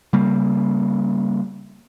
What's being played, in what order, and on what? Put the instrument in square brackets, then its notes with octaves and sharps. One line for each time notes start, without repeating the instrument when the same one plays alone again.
[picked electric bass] C#3 G3 A#3